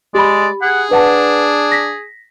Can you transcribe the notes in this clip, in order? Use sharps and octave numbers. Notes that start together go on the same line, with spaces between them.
G#3 G4 D5 B5
G#4 F#5
D4 B4 F#5 A5
A#6 B6